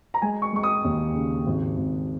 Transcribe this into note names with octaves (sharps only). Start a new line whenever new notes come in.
A#5
G#3 G#5
C#6
G#3 C#6
D#6
D#2
C#3
G#1
G#1